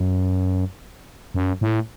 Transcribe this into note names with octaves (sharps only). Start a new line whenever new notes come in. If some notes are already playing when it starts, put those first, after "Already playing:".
Already playing: F#2
F#2
A2